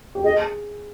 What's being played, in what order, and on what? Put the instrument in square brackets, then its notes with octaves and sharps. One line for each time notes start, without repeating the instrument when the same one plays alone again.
[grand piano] G4
[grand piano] G#4 [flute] D#5